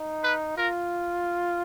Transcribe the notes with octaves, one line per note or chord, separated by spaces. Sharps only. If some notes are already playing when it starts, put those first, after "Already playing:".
Already playing: D#4
B4
F4 A#4